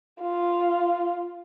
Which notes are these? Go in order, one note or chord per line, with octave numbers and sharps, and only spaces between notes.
F4